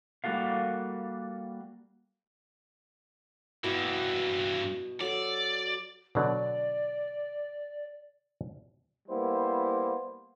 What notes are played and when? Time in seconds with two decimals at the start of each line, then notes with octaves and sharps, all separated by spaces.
0.24 G3 A#3 D#4 F#4 A4 F5
3.64 G2 B2 E3 E4
5.00 F#3 A4 D5 C6
6.15 B2 D3 F#3 D5
9.09 G3 A#3 B3 E4 C5